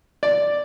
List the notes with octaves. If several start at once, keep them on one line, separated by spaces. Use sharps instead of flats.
D5